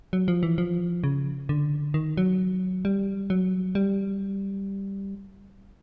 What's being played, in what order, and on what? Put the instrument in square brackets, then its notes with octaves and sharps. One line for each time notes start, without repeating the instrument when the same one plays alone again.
[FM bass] F#3
F3
E3
F3
C#3
D3
D#3
F#3
G3
F#3
G3